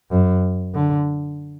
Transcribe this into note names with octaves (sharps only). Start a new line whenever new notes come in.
F#2
D3